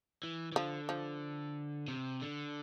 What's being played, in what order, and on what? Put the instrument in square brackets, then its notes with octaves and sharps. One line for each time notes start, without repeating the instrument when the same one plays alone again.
[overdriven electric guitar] E3
E3
[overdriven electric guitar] D3 [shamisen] F3
[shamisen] F3
[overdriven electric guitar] C3
D3